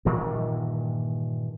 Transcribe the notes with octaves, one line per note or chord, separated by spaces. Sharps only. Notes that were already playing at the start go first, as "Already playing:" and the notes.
G2 A#2 D#3 E3